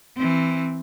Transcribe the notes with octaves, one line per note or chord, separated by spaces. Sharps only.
E3 C4